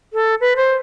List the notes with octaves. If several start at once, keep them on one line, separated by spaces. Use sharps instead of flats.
A4
B4
C5